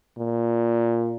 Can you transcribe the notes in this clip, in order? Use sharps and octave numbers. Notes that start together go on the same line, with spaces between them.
A#2